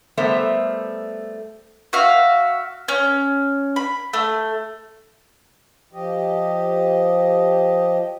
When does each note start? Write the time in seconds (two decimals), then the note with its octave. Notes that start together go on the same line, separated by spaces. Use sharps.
0.17 G3 A3 B3 A#4 C5 E5
1.93 F#4 E5 F5
2.88 C#4
3.76 B5
4.13 A3
5.93 F3 G4 D#5